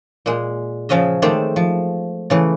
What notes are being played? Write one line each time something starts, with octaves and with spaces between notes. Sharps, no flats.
A#2 G#3
C#3 F3 C#4 D#5 E5
D#3 G#3 A3 C4 C5 D5
F3
C#3 E3 A3